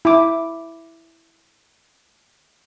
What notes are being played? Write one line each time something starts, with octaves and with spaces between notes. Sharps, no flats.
E4 D6